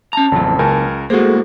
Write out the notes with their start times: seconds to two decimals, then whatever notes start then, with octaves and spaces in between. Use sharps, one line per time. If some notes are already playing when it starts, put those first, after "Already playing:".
0.13 C#4 A5 A#5
0.32 A1 F2 C#3 F#3
0.59 C#2 A#4 G#5
1.10 A2 G#3 A#3 F#4 G#4 A4 C5